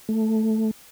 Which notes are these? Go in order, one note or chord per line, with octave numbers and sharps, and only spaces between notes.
A3